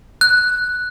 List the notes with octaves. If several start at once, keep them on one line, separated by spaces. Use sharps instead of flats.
F#6